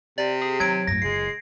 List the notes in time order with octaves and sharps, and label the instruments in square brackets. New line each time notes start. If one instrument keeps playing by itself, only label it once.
[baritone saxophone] C3 [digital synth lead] D5
[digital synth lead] G#4
[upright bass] D#3 [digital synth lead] F#3 [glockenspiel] G#6 D7
[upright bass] F#2 A2 [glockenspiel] A#6
[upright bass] F#1 F4 [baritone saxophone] G#3 [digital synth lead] C7